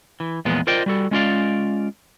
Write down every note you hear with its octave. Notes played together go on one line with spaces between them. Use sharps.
E3
E2 A#2 F3 G#3 B3
F4 A#4 C5 D5 D#5 G5
G3 F#4 A4
G#3 C#4 F4 D5 F5